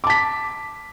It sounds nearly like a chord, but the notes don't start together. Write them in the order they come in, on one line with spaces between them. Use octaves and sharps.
D6 A5 B6